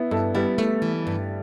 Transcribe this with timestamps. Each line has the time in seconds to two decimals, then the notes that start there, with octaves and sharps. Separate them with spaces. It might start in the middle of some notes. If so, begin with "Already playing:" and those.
Already playing: B3 E4
0.11 G2 E4 A4
0.35 G3 B3 E4
0.58 A3
0.82 E3
1.07 G2